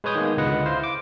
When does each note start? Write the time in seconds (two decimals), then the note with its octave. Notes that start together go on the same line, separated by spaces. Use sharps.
0.04 G#3 B4 C#5 D#6 G6
0.15 D#3 G#3 A#3 B3
0.38 C#2 D3 G#3 B4 D#5 F#5
0.65 E4 C5 F5
0.84 D6